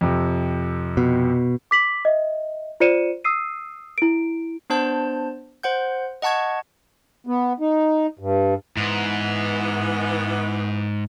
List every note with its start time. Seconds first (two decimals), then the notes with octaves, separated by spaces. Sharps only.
0.01 F2 C3
0.97 B2
1.71 D6 B6 F#7
2.05 D#5 E5
2.80 F4 C5 D5 C#7 D#7 E7
3.24 D#6 E6 C7 D#7
3.98 E4 D7
4.70 B3 D4 C5 A5 G6
5.63 C5 F#5 G6
6.22 D#5 F#5 A5 C#6 G#6
7.27 B3
7.60 D#4
8.19 G2
8.77 G#2 E3 B3